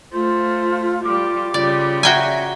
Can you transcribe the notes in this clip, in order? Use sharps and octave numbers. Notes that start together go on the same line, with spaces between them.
A3 F4 C5
G3 F4 D6
C#3 G3 F4 D5
F#4 E5 G5 G#5 A#5